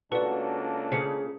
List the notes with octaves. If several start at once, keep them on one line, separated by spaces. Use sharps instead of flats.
C#2 A#3 D4 F#4 A4 B4 D5
C#3 G#4 C5 C#7